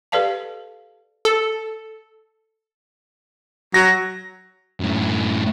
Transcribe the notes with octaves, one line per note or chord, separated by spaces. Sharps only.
G4 A4 B4 D5 F5 A5
A4
F#3 A#6
F#2 A2